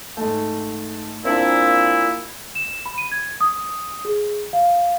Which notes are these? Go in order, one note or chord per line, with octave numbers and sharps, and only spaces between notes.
G#2 A3
A#2 C4 D4 E4
E7
B5
D#7
G#6
D#6
G#4
F5